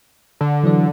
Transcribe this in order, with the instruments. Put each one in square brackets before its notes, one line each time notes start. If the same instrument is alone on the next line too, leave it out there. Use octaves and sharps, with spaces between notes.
[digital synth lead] D3
[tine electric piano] E3 F#3 D5